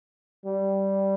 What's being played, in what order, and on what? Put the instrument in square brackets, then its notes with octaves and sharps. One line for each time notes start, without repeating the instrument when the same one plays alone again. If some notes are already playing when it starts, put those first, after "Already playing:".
[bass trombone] G3